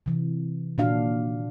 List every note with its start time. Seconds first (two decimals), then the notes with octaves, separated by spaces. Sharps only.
0.06 C3 E3
0.78 A#2 D#3 A#3 D4 F#4 F5